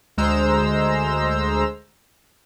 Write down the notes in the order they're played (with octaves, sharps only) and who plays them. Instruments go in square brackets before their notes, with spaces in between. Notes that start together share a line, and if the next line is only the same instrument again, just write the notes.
[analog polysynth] D2 G#3 C5 A#5 E6